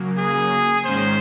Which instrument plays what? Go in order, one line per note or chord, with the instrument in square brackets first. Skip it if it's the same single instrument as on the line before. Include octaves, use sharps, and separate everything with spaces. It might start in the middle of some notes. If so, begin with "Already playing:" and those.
Already playing: [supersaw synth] C#3 F#3 A#3
[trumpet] G#4
[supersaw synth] G#2 D#3 G#3 C#4 [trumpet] C5